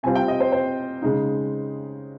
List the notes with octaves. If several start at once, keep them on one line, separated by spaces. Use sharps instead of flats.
C3 G3 C4 F4 G#5
G5
D#5
C5
C5
C#3 G#3 D#4